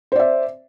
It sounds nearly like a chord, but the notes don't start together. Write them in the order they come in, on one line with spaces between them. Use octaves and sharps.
C5 D5 E5